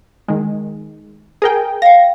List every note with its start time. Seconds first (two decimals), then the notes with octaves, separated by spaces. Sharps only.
0.28 D#3 G#3
1.42 G#4 A#4 G5
1.82 F5 G5 A#6